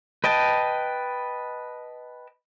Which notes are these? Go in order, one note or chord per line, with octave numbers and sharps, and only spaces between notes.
B4 D#5 G5 A5